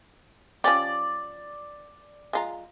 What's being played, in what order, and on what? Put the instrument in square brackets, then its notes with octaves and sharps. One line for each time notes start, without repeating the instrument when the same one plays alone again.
[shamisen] F3 C#4 G4 [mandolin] D5
[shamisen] G#3 F4 A#5